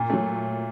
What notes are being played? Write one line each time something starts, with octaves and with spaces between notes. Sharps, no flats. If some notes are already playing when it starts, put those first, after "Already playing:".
Already playing: A#2
F#3 A3